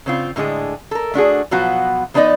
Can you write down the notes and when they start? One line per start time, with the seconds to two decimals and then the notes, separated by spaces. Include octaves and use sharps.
0.06 C#3 C4 F4
0.36 A2 D3 G#3 G#4
0.91 A4 A#4
1.14 A3 D4 F#4 G#4
1.51 B2 F3 F#3 B3 F4 F#4
2.14 F3 B3 D4 D#4 D5 D#5